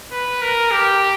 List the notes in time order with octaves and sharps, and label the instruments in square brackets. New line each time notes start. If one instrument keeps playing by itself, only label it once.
[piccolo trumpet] B4
A#4
G4